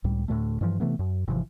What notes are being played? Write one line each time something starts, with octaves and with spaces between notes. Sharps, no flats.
C#2 A2 G3
D2 A2 G3 A3
G2 E3 F3
C3 E3 A3 B3
F#2
G#1 C3 E3 F3